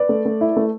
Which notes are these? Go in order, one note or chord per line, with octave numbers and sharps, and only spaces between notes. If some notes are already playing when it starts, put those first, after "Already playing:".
Already playing: B4 D5
A3
A3
E4
A3